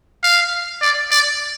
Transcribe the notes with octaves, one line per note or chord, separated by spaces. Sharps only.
F5
D5
D5